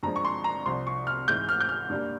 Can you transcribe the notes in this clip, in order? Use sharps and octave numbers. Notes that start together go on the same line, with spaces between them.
G2 F3 G#3 A#5
C#6
C6
A#5
C2 C3 F3 C6
C#6
F6
G#2 E3 G#3 G6
F6
G6
F6
G2 G3 A#3